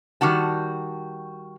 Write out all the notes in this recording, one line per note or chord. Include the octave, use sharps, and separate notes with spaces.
D#3 G3 F#4 A5